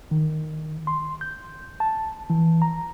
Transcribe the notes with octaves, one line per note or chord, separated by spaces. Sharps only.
D#3
C6
G6
A5
E3
A#5